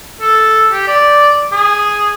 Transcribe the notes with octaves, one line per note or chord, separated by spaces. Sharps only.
A4
G4
D5
G#4